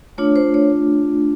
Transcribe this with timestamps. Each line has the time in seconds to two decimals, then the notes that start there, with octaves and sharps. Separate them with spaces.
0.18 A3 D4 F4 C#5
0.36 C5
0.54 C#5